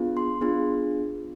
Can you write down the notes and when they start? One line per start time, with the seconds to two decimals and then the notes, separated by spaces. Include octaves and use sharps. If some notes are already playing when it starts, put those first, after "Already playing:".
Already playing: B3 D4 F4 G#4
0.17 C6
0.41 B3 D4 F4 G#4